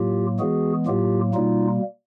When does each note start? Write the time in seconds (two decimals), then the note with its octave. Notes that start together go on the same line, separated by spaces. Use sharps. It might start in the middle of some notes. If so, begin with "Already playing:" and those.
Already playing: A2 F#3 A#3 F4 G4
0.39 E3 G#3 B3 F#4 G#4
0.87 A2 F#3 A#3 F4 G4
1.34 B2 G3 A#3 D#4 F4